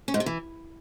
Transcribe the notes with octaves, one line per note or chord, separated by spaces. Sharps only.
C#4
G#2
C3
E3